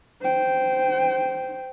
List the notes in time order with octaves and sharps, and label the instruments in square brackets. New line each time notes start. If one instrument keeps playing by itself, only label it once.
[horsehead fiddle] C5 G5